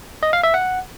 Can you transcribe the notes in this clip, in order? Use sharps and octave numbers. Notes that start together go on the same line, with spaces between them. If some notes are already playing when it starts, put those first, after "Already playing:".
D#5
F5
E5
F#5